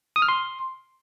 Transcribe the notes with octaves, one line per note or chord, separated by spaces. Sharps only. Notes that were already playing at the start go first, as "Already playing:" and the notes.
D#6
F6
C6